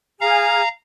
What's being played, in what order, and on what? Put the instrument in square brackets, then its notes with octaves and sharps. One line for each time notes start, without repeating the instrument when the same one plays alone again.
[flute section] G#4 G#5 F6 [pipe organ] F5 A#5